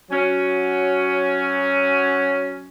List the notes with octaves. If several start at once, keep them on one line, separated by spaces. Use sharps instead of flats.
F#3 C#4